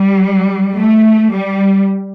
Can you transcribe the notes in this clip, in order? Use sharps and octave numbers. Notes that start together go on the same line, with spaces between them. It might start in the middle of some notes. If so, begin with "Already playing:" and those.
Already playing: G3
A3
G3